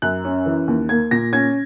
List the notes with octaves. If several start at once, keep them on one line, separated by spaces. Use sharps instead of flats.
F#2 F#6
C#4
E3
D#2
A#3 G#6
A#2 A#6
C#4 G#6